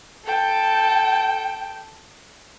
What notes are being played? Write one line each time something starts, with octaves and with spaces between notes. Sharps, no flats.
A4 G5